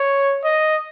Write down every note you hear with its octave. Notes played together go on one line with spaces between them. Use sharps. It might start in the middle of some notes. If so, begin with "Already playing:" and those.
Already playing: C#5
D#5